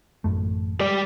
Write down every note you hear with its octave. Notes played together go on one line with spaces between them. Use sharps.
A1 F#2 A3
G3 D5